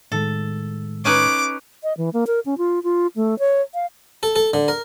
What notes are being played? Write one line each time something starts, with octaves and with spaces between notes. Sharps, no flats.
A2 D#3 G#3 A4
C#4 D#4 B4 D6
D#5
E3
A#3
A#4
C#4
F4
F4
A3
C#5
F5
A4
A4
D3
A#4